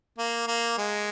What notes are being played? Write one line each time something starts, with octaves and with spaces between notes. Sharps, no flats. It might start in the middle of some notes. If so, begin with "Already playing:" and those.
A#3
A#3
G#3